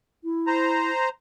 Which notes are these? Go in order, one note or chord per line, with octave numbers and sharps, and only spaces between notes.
E4
C5 A#5